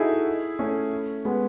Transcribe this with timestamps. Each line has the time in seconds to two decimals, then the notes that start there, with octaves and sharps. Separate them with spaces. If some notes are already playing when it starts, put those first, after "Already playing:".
Already playing: D#4 E4 F#4 G#4 A4
0.59 A3 C#4
1.25 G#3 B3